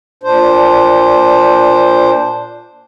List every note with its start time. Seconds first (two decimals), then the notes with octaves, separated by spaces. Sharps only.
0.23 A#2 D4 C5